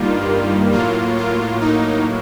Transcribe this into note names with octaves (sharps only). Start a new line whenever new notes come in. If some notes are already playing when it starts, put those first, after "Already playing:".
Already playing: G2 D#3 G3 A#3 F4
A2 F#3 A#3 F4
F4
D#4